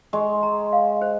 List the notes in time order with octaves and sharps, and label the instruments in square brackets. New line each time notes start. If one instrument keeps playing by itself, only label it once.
[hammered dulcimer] G#3 [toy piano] C#6
[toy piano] A#5
F5
C5